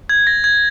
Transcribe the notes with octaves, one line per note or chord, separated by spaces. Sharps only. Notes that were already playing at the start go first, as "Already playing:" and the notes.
G#6
A#6
G#6